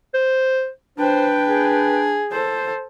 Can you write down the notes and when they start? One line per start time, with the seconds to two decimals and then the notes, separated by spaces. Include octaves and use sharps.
0.14 C5
0.98 D4 B4 C5 G5
1.47 G#4
2.31 A4 C5